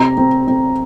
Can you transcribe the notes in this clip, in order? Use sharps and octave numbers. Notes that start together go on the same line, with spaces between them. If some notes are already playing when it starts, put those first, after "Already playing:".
Already playing: C3 C4 A#5
C4
C4